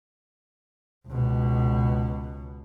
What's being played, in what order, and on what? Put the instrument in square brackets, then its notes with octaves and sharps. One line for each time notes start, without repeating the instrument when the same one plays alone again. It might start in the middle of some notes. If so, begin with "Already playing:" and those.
[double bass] C#2 B2